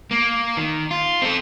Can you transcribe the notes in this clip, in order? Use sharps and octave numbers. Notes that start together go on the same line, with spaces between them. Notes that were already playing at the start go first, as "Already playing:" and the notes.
A#3
D#3
F4
C4 A4